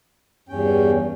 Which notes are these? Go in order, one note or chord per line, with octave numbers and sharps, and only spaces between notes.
E2 G2 C#4 G5